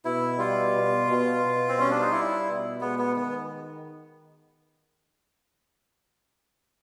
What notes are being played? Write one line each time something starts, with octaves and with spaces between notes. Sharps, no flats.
B2 E4
G3 F4
B2
B2
B2
C4
G3 C#4
D4
D#4
G3 E4
B2
G#3 B3
B3
D#3 B3